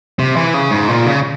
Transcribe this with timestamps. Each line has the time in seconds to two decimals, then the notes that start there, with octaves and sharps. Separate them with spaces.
0.19 C3
0.36 E3
0.54 C#3
0.71 G#2
0.88 A#2
1.06 C#3